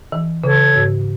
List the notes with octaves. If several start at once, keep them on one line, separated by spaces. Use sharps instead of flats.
E3
C#3 A4 C#5
G#2